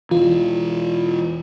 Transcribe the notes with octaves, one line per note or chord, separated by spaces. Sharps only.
E1 E3 F4